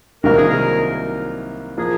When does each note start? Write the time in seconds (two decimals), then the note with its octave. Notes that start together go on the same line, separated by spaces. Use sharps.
0.23 C2 C3 D#3 F#3 A#3 A#4
0.38 G#4
0.50 A#4
1.78 F3 A#3 G#4